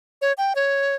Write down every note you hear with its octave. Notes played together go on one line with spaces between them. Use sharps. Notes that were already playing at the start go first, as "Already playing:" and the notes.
C#5
G5
C#5